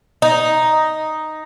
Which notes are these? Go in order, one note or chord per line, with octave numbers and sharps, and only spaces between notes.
D#4